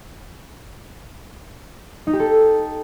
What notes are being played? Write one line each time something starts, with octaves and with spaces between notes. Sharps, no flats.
D#4
G4
A4